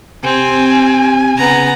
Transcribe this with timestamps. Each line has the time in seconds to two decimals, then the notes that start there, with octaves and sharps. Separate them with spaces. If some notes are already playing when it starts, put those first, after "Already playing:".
0.24 C3 C4 G#5
1.38 C#3 B3 A#5